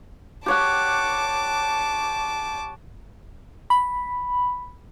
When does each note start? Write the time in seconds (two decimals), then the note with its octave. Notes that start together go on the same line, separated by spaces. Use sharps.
0.46 G4 C#5 F#5 A5 D6
3.70 B5